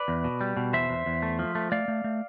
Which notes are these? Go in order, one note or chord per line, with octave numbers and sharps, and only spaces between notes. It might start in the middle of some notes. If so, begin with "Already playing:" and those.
Already playing: B4 D5
E2
B2
G3
B2
E2 C5 E5
E2
E2
A3
F3
A3
A3 D5 F5
A3
A3